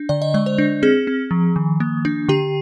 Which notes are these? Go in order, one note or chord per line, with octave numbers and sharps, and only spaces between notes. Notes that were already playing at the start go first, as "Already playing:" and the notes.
Already playing: D4
D3 D5
D#5
G#3 D5
C5
D4
C4 G#4
C4
F3
D#3
A#3
D4
D3 G4